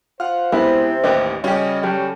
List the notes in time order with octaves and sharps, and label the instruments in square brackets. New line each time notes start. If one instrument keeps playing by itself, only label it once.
[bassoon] F4 [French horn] C5 [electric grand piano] F#5 F6
[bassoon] C3 [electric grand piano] G#3 [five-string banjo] B3 E4 B4
[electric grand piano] A1 D#2 [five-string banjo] G4 B4 D#5
[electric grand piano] C#3 G3 C#4 [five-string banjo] F#4 G4 [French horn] D#5
[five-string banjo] F#3 [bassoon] G4 [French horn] A4